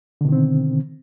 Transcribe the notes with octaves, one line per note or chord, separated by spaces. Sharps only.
B2 D3 D#3 C4